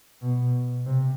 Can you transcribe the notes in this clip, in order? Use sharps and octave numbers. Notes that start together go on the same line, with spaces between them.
B2
C3